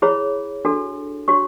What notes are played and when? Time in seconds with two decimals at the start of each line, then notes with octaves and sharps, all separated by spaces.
0.02 E4 G#4 C#5 B5
0.65 D4 F#4 A4
1.28 D4 F#4 C#5 C#6